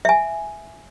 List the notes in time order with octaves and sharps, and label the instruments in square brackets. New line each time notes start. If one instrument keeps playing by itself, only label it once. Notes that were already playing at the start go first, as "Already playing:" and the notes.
[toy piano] E5 G#5